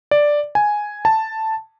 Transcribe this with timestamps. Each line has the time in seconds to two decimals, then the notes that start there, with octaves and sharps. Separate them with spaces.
0.11 D5
0.55 G#5
1.05 A5